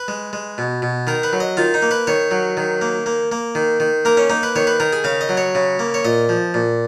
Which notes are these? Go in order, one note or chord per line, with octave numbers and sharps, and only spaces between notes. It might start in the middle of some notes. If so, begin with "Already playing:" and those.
Already playing: B4
G#3
G#3
B2
B2
D#3 A#4
B4
F#3
D#5
D#3 F4
D#4
A#3
B4
D#3 C#5
F#3
D#3
A#3
A#3
A#3
D#3
D#3
A#3 A#4
C#4
A#3 D#4
B4
D#3 C#5
B4
D#3 A#4
G#4
C#3 F5
D#5
F#3
C#5
C#3
A#3
C#5
A#2 D#5
F3
A#2